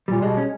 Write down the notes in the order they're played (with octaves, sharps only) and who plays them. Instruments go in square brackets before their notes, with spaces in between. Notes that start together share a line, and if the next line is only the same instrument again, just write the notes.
[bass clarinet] A#2 [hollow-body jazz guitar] G3
[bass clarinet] B2 [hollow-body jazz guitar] G#3
[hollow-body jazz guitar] C#4